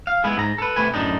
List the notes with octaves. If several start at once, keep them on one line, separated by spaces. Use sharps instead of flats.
F5
G#3 B3 E4 G#4
G#2 A#5
A4 B4
C3 A3 B4 G#5
F#2 A2 D4 D#4